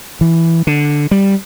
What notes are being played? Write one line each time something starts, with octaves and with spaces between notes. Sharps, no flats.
E3
D3
G3